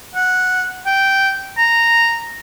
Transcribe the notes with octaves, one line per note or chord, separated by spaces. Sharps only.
F#5
G5
A#5